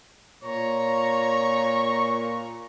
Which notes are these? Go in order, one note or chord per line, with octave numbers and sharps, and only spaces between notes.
A#2 C#5 A#5 C#6